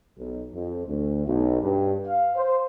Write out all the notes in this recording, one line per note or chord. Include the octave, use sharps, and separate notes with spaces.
B1
F2
D2
B1
G2
F5
C5